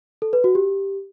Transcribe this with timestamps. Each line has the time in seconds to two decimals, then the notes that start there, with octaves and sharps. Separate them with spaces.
0.22 A4
0.33 B4
0.44 F#4
0.55 G4